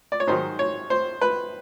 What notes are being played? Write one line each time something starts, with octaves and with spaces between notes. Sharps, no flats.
D5
C#5
G#2 D#3 F#3 C5
C#5
C5
B4